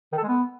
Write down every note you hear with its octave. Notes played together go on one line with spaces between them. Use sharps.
D#3
A4
G#3
B3